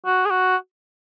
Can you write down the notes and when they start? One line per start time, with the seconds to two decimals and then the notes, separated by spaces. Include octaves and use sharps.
0.06 F#4
0.26 G#4
0.30 F#4